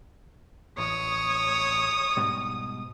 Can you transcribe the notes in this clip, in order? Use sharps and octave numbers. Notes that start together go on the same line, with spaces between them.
A1 C#5 D#6
G#2 B2 G3